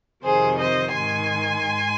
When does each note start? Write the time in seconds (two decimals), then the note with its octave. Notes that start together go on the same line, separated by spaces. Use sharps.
0.23 F2 C3 D#3 G#4 C5
0.59 C5 D#5
0.94 G#2 D#3 G#5 C6
1.65 G#2